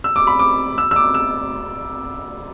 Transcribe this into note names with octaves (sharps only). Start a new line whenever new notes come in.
E6
D6
B5
D6
E6
E6
D6
E6